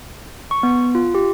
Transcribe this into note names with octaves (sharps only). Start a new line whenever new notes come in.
C#6
B3
F4
G4